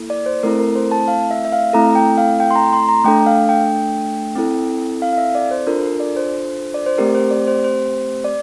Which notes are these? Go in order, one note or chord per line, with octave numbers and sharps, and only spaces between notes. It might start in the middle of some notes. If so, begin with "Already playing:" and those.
Already playing: A#3 E4 A4
D5
C5
A3 C4 E4 A4 A#4
A#4
C5
A5
F5
E5
E5
F5
A3 C4 E4 A4 A#5
G5
F5
G5
C6
A#5
C6
A#5
A3 D4 A4 G5
F5
G5
C4 E4 A4
F5
F5
E5
D5
C5
D4 F4 A4 A#4
A#4
D5
C5
D5
C5
A3 C4 G4 A#4
C5
D5
C5
C5
D5